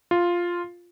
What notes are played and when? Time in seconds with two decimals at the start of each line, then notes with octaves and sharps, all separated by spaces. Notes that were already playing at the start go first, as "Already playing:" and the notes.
0.11 F4